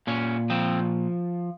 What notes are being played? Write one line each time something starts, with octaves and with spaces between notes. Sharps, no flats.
A#2 C#4
F3 C4